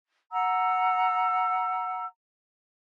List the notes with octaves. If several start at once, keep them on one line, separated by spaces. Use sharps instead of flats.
F#5 A#5 E6